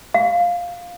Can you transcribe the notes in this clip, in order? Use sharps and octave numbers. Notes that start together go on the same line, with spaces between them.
F5